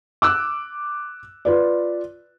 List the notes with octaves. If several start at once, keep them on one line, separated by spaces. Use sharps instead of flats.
D6 E6 F#6
F4 B4 D5